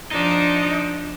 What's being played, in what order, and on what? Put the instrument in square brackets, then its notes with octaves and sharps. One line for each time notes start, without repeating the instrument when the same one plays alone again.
[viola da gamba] F3 D4 [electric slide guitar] D#4